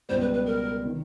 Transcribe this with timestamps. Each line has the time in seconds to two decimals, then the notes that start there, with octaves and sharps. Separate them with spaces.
0.09 C#2 B2 G3 B3 C5
0.21 B4
0.34 B4
0.46 A#4
0.85 C3 D#3